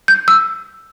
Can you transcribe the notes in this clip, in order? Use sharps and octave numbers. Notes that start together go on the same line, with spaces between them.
G6
E6